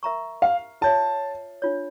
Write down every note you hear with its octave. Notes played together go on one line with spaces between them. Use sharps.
A#4 E5 A#5 C#6
F5
F4 C#5 E5 A5
D4 F4 C#5